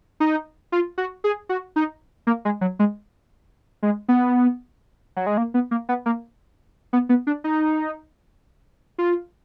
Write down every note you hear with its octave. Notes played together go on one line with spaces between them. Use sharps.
D#4
F4
F#4
G#4
F#4
D#4
A#3
G#3
F#3
G#3
G#3
B3
F#3
G#3
A#3
B3
A#3
B3
A#3
B3
B3
D4
D#4
F4